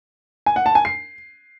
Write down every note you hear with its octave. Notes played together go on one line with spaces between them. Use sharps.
G#5
F#5
A5
G#5
C7